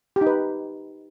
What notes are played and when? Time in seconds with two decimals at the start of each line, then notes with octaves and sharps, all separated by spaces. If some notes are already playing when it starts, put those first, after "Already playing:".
0.16 G4
0.21 D#4
0.26 B4